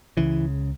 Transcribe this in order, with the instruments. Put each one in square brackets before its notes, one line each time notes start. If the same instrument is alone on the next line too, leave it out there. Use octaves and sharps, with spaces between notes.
[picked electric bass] C#2 C#3 E3